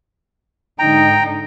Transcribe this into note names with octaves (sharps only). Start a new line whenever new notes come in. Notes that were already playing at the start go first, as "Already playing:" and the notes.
G#2 D3 D#4 G5 A#5